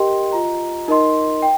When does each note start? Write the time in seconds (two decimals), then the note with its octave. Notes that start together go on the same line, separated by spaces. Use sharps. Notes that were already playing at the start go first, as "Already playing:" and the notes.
Already playing: G4 A#4 D#5 G5 C6
0.32 F4 D#5 A#5
0.88 D#4 A#4 D#5 C6
1.42 G5